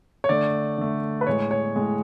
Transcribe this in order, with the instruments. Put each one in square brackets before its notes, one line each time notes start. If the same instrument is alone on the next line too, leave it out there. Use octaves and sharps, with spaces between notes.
[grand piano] C#5
D3 A3 D5
D3 A3
B4
A2 G#3 C#5
C#5
A2 G#3